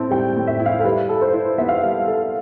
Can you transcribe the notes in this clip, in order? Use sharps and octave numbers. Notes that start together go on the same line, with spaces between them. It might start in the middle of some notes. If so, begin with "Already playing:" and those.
Already playing: A2 C4 E4 A5
G3 G5
A2
E5
E4
F5
A4
G3 B4
A4
C5
E4
B3 E5
F5
E5
G3
A4